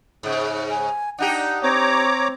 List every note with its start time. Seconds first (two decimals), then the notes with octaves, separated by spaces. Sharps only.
0.23 G#2 C#3
0.70 G#5
1.18 D4 D#4 G4 F#5
1.63 C4 C#5 A#5 D6